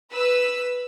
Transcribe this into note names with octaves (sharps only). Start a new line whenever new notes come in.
B4 E6